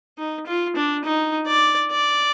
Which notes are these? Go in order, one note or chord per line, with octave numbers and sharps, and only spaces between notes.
D#4
F4
D4
D#4
D5
D5